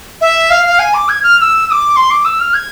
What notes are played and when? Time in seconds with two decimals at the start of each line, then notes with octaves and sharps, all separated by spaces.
0.21 E5
0.50 F5
0.65 F5
0.79 G#5
0.94 D6
1.09 G#6
1.23 F6
1.37 F6
1.41 E6
1.67 E6
1.71 D6
1.96 C6
2.10 D6
2.25 E6
2.40 F6
2.54 G#6